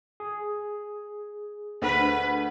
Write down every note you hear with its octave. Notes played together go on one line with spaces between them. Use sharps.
G#4
D2 B4